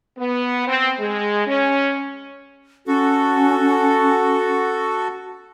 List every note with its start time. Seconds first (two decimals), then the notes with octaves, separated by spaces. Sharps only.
0.18 B3
0.68 C4
0.99 G#3
1.47 C#4
2.87 C#4 F#4 A4